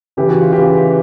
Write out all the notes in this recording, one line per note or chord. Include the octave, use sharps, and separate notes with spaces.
C#3 E3 G4
F#4
F4
C#3 E3 G4